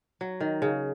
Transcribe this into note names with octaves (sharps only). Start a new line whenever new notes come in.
F#3
D#3
C#3